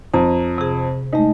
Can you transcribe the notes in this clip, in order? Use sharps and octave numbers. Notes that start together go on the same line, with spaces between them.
F2 A#5
C3 G#4
G#3 A3 D#4